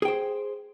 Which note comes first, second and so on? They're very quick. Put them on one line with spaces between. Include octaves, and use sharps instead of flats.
G#4 G5 C5